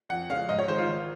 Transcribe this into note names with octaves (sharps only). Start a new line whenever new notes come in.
F2 F#5
C#3 G#3 C#4 F5
G#2 D#5
C#5
D#3 G#3 C5
F4
G#1